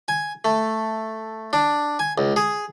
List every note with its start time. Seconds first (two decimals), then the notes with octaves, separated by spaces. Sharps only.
0.08 G#5
0.45 A3
1.53 D4
1.99 G#5
2.18 C#2
2.36 G#4